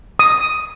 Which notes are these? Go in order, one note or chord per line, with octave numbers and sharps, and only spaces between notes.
D#6